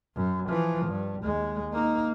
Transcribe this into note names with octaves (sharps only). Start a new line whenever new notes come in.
F#2
E3 F3
G2
D#2 G#3
A#3 D#4